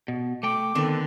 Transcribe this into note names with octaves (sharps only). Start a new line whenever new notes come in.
B2
A3 G5 D6
D3 D#3 B3 C4 A4